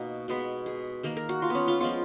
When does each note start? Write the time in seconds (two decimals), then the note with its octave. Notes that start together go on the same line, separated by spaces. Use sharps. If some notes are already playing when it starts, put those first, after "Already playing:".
Already playing: B2 A#3 D#4 F#4
0.28 B2 G#3 B3
0.66 G#4
1.03 D#3 A#3 A#4
1.17 A#4
1.29 F#4
1.42 F4
1.50 B3 C#4
1.68 F4
1.80 F3 G#3 B3 F4